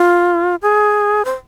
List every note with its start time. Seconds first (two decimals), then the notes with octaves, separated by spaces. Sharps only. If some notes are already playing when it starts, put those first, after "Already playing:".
Already playing: F4
0.62 G#4
1.25 C5